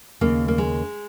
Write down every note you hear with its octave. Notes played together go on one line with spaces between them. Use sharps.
D#2 C#3 A#3
A#3
G#3